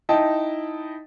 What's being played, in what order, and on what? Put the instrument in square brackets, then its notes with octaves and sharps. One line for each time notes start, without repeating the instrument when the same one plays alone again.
[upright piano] D#4 E4 D#5 G5 A5